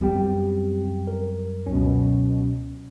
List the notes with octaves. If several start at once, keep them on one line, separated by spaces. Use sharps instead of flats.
F#2 G3 B3 C4 G4 G5
A#4
C#2 B2 F#3 C#4